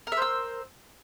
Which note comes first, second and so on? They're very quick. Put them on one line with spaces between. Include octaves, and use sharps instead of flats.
A#4 E5 C5 E6